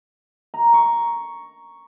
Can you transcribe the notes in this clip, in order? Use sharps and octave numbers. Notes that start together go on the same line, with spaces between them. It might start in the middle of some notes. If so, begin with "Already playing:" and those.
A#5
C#6